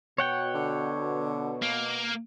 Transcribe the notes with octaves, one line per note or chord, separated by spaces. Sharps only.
B2 C#5 F#5 G5
D3
A#3